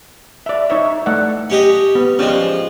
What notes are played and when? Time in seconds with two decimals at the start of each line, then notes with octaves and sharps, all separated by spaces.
0.46 D5 E5
0.70 D#4 C#5 E5
1.06 A3 D5 F#5
1.50 C#4 G4 D#5
1.95 B3
2.19 F3 G#3 C#4 G4 D5